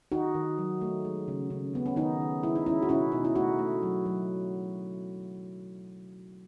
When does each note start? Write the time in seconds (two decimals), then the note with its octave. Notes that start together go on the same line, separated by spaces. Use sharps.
0.12 D#3 D#4 F#4
0.35 D#3
0.58 F#3
0.81 A3
1.05 G#3
1.28 C#3
1.50 C#3
1.74 C#3 B3
1.86 C#4
1.96 D#3 B3 D#4
2.20 D#3
2.43 G#3 E4
2.55 D#4
2.66 G#3 C#4 E4
2.82 F#4
2.89 B2 C#4 E4
3.12 B2 D#4
3.24 E4
3.35 A3 D#4 F#4
3.59 A3
3.83 F#3
4.06 F#3